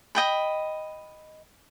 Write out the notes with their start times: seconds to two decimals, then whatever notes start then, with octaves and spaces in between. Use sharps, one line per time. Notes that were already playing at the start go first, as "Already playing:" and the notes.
0.15 D#5 G5 B5